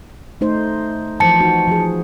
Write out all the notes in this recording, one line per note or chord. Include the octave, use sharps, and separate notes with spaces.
A3 D#4 C5
E3 F3 C5 A5 C#7
D#4 F#4
F3 G#4